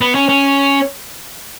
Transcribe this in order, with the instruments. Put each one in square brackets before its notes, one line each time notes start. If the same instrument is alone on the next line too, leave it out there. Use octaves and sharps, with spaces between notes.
[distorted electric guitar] B3
C#4
C#4